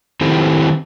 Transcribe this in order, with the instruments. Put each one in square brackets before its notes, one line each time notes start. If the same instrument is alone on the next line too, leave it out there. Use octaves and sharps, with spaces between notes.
[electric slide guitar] D#3 C4 E4 G4 A4 C5